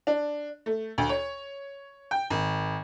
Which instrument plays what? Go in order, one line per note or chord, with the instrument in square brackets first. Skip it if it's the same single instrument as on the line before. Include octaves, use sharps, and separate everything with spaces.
[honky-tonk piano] D4
A3
D2
C#5
G5
G#1